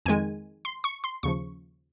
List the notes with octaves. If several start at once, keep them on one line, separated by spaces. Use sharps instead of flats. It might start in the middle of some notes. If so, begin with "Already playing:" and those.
F2 D#3 G#3 G#5
C6
C#6
C6
D#2 C#3 F3 C#6